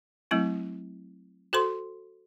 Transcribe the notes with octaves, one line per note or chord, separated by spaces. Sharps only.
F#3 A3 C4 E4
F#4 A4 C5 C6